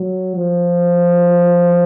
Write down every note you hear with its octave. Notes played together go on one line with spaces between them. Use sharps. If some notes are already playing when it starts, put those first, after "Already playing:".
Already playing: F#3
F3